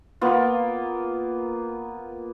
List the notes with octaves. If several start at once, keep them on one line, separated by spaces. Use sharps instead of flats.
A#3 B3 F4